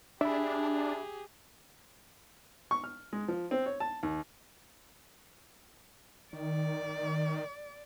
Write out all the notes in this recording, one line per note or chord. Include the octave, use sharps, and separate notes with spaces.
D4 G4 G#4 E5 B5
C#6
F6
G#3
F3
C4
C#5
A5
D#2
D#3 D5